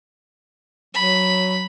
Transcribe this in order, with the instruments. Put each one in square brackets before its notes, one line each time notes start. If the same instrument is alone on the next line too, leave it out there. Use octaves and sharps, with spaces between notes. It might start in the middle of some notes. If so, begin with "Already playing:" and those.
[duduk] F#3 [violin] B5